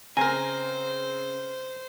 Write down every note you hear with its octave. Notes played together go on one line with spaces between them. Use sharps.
C#3 C4 A#4 C5 G#5 A#5